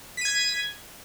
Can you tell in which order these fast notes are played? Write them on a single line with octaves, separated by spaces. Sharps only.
B6 D#7 G#6